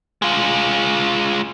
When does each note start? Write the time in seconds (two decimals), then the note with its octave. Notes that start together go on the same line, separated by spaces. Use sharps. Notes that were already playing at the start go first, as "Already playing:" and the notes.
0.22 G#3 F4